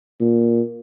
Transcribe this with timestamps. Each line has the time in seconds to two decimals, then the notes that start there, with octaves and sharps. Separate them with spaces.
0.21 A#2